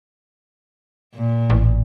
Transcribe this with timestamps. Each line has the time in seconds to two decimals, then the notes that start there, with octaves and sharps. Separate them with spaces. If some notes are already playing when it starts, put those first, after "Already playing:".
1.14 A#2
1.50 A1